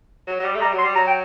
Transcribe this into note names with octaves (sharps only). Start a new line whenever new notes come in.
F#3
F#3
G3
A3
G3 A#5
F#3
C6
G3
F#3 A#5
G5